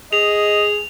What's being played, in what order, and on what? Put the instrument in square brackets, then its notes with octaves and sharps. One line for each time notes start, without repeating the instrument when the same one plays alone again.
[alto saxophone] G#4 [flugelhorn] D#5 [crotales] F7